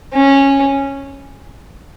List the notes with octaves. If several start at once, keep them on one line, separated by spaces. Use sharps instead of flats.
C#4